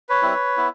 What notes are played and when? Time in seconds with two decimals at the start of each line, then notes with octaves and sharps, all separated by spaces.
0.09 B4 C#5
0.22 G3 C4 E4
0.57 B3 E4